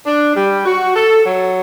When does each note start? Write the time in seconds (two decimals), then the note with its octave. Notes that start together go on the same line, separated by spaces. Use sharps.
0.06 D4
0.35 G3
0.65 F#4
0.95 A4
1.25 F#3